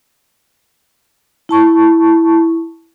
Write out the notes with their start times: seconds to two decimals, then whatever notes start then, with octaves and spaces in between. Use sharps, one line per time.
1.49 E4 A5 C#6